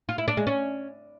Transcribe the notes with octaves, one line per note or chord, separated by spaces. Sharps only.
F4
E4
D4
G#3
C#4